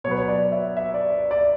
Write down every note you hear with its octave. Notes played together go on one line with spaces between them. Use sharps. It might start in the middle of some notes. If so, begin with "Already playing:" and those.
B2 F#3 B4 C#5
C#5
D5
E5
E5
D5
D5
D5